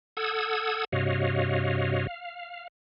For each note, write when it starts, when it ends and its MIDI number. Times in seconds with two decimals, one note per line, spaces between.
0.17 0.85 69
0.17 0.85 78
0.17 0.85 87
0.17 0.85 88
0.17 0.85 92
0.92 2.07 43
0.92 2.07 48
0.92 2.07 66
0.92 2.07 73
0.92 2.07 75
0.92 2.07 77
2.07 2.68 77